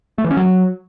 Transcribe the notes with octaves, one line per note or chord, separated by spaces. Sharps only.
A3
E3
C#4
F#3